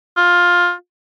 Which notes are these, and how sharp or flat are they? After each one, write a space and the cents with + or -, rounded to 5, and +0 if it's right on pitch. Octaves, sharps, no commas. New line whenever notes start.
F4 +15